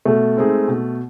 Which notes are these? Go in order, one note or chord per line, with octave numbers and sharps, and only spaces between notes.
B2 A3
G#3 C4 D#4 G#4
B2